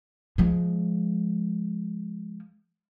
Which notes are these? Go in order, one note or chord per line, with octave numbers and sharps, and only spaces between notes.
F3 G#3